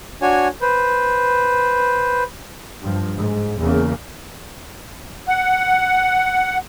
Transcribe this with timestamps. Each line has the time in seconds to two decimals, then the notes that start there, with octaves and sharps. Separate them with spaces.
0.22 D4 F#4 C#5 G#5
0.61 B4 C5
2.82 G2 F3
3.18 G#2
3.61 E2 C#3 A#3
5.28 F#5